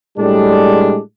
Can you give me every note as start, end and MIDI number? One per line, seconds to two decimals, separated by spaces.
0.18 0.98 45
0.18 0.98 55
0.18 0.98 56
0.18 0.98 62